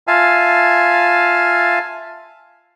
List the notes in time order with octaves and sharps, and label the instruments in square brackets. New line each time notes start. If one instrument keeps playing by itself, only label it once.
[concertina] F4 E5 F5 G#5 A5